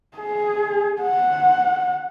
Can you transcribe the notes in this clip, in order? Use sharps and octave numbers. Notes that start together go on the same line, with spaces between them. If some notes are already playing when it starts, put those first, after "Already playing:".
G#4
F#5